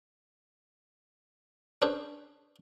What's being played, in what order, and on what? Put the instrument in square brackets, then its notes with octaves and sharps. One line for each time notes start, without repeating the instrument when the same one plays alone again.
[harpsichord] C#4 D4 G#4 B4 C5